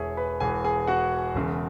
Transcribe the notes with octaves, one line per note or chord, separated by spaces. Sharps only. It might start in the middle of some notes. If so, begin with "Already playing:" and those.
Already playing: E1 E2 E3 G#4 C#5 E5 G#5
B4 B5
E1 E2 E3 G#4 G#5
G#4 G#5
F#4 F#5
E1 E2 C#3